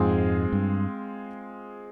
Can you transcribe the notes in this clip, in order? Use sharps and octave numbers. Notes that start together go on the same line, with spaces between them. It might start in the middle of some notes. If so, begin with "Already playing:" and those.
Already playing: F2 G#2 G#3 C4 F4 G#4
G2